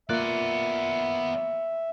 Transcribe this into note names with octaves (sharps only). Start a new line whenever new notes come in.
A#3 B3 F4 D5 E5 F#6